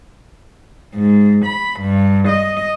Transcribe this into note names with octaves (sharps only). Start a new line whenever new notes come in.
G#2
B5
G2
D#5